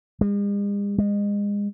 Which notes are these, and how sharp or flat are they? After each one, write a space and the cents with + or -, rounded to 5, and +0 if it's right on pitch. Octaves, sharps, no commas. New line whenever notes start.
G#3 -45
G#3 -30